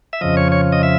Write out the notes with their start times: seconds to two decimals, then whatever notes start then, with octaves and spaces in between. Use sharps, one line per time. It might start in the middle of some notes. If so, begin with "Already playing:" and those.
0.13 E5
0.21 F2 C#3 F3 D#5
0.37 C#5
0.52 C#5
0.72 D#5
0.83 E5